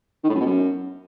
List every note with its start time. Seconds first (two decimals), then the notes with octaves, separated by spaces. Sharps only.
0.24 D#3
0.29 A2
0.35 F#2
0.40 B2
0.46 F#2